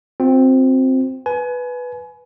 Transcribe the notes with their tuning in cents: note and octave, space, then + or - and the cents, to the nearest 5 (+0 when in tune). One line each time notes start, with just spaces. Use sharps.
C4 +0 F4 +45
B4 +0 G#5 +30